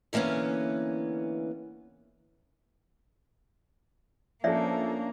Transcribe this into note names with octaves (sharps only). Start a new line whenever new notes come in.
D3 E3 A#3 B3 C#4
F3 A#3 C#4 D4 A4 C#5 D5 E5